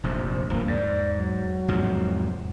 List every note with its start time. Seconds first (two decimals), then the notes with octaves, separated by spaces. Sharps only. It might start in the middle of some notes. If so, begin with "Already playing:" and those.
0.03 F1 A#1 D#2 C5
0.50 D1 G2 F3 A#3
0.68 E2 G#2 D5
1.16 F#3
1.68 E2 G#2 C3 F3